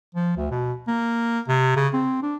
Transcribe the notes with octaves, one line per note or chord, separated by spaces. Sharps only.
F3
D2
B2
A#3
C3
C#3
C4
D4